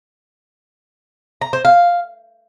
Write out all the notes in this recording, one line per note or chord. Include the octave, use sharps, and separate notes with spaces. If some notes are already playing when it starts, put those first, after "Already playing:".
A#5
C5
F5